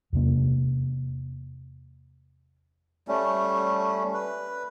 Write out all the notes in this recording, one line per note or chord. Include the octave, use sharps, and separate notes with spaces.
E2 C3 A#3
G3 A3 C#4
B4